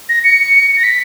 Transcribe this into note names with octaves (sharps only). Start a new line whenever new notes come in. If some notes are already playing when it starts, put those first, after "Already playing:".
A#6
C#7
A#6
B6